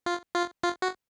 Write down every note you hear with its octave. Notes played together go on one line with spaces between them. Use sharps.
F4
F4
F4
F#4